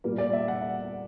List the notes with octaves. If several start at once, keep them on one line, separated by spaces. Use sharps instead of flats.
A#2 G3 A#3
D5
E5
F#5